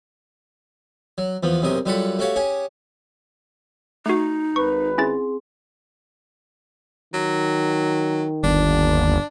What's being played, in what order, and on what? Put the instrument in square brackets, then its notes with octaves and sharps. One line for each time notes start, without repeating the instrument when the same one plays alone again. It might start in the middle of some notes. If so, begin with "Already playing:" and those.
[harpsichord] F#3
E2 F3 B3
B1 F#2 C3 A#4 D#5
F#2 G3 F4 A4 F#5 B5
A3 F#4 G4 C#5 F5
C#4 G4 G#4
[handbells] A3 F#4 [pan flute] D#4
[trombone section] G#1 B4 [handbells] C#6
[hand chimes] C4 G#4 C6 [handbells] C#4 E4 A6
[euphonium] D#3 [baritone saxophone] F#3
[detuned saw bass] G1 [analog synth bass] D#2 [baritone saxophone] D4